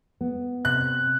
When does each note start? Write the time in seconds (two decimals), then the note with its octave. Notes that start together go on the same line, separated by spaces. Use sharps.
0.21 B3
0.65 C3 F#6